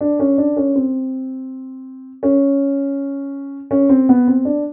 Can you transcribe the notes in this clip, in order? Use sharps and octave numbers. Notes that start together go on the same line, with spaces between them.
D4
C#4
D4
C#4
C4
C#4
C#4
C4
B3
C4
D4